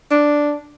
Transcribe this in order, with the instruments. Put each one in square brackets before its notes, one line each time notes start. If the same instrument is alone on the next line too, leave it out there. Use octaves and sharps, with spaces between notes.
[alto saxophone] D4